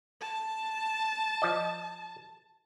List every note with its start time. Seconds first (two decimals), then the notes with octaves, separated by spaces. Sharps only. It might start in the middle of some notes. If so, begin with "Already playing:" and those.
0.21 A5
1.42 F3 D5 D#5